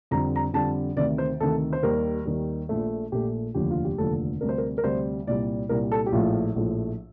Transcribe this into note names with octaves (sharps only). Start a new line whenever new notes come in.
F2 D3 G3 A#5
A#5
F2 D3 G3 A5
D2 C3 D#3 D5
C5
D2 C3 D#3 A4
C5
D#2 D#3 G3 A#4
D#2 D#3 G3
A#1 A#2 A3
A#1 A#2 A3 G4
F1 D#2 D3 F3 G4
F4
G4
F1 D#2 D3 F3 A4
D2 C3 G3 A#4
C5
A#4
A#4
D2 C3 G3 C5
C2 A#2 G3 D5
C2 A#2 G3 A#4
A4
G4
A#1 A2 F3 A3 F4
A#1 A2 F3 A3